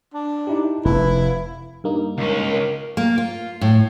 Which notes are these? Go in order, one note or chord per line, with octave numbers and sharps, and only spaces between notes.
D4
D#4 E4 G4
F1 E4 B4
G2 A#3 D#4
C#2 C#4 A#4
A#3
F4
A2